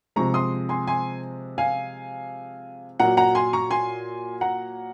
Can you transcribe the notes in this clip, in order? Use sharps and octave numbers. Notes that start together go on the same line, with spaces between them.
C3 F3 G#3 A#5 C#6
C6 D#6
G#5 C6
G#5 C6
F5 G#5
A#2 F#3 F#5 A#5
F#5 A#5
G#5 C6
A#5 C#6
G#5 C6
F#5 A#5